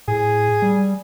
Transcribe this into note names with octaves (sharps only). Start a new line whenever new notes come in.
A2 G#4
G3